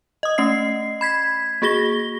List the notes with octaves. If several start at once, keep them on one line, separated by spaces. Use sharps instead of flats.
D#5 D#6
A3 C#4 D#5 C7
B5 G#6 B6
A#3 F#4 G#4 A#6 G7